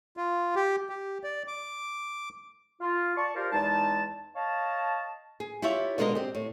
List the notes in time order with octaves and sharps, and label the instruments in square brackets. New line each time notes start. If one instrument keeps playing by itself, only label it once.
[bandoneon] F4
G4
G4
D5
D6
[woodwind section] F4
D5 A5 C#6
F4 G4 A#4 C5 D5
E2 G#3 D#4 A5
C#5 D#5 F5 A5
[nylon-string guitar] G#4
E4 F4 G4 C#5 E5
B2 D3 G#3 A#4 D5 D#5
C4 G4
A2